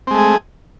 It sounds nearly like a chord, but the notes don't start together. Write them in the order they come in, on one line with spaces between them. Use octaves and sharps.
C4 G#3 A3 G#4